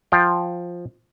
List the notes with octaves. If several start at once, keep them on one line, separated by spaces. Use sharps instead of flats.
F3 F5 G5